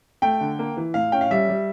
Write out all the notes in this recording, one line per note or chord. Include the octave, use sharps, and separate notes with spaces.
A3 G5
D3
A#3
E3
A2 F5
C#4 G5
F5
G3 E5
G3